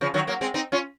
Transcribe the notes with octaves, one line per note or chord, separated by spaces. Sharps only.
C#3 F3
D#3 F#3
F#3 A#3
G#3 C4
C4 D#4
C#4 F4